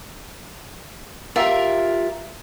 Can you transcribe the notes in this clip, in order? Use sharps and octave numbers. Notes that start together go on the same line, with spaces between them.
F4 G4 A#4 E5